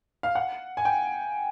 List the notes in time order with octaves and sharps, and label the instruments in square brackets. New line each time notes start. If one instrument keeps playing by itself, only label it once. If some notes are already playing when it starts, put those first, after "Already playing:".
[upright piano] F5
F#5
G#5
G5